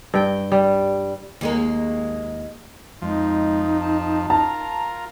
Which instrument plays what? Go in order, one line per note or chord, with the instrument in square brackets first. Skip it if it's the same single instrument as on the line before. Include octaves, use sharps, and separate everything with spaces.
[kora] G2 G5
G3
[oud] D#2 G#3 A#3
[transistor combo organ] F2 F3 [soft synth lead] G#3 [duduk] D#4
[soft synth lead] A5
[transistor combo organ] F4 A#4 [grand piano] A5 [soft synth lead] A#5